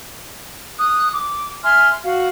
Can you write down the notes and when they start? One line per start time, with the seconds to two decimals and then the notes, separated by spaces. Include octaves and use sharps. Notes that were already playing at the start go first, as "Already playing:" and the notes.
0.79 D#6 F#6
1.13 D6
1.64 E5 G#5 C6 F6
2.04 F#4 F5